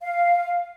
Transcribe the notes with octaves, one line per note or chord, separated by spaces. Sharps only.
F5